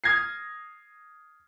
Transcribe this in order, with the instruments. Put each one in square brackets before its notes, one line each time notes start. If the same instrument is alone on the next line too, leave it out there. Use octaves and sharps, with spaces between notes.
[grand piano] D#6 F6 G#6 A#6 C7